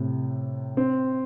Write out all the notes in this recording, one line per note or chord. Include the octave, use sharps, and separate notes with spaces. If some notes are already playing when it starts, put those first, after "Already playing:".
Already playing: A2 C3
C4